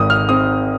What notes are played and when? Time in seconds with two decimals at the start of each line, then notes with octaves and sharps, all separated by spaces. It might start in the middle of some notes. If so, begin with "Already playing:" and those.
Already playing: G#1 G#2 D#6
0.10 F6
0.29 C4 D#6